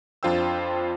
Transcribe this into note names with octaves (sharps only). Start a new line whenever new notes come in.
F2 D4 F4 C5 G5 E6